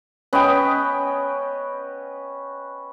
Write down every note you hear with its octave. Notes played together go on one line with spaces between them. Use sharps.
B3 C#4 B4 D#5 G5